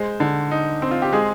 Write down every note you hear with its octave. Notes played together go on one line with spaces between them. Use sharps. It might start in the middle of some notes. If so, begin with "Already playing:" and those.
Already playing: G#3 C5
D3
D#4
C4
F4
G4
G#3 G#4